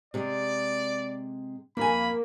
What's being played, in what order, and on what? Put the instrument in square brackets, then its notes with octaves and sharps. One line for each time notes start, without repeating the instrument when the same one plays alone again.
[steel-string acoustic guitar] C3 G#3 [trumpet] D5
[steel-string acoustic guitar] F2 G#5 [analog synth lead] A#3 [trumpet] B5